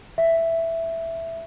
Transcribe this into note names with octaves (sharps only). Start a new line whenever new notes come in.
E5